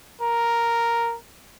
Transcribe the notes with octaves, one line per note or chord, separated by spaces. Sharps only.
A#4